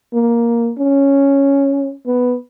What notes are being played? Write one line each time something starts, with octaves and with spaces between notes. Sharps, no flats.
A#3
C#4
B3